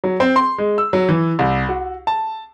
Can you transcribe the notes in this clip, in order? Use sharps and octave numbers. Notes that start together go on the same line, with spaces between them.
F#3
C4
C6
G#3
E6
F#3
E3
C2
F#4
A5